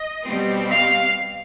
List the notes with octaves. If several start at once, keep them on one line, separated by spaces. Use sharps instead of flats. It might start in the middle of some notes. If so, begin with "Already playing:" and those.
Already playing: D#5
B2 G3 C4
F5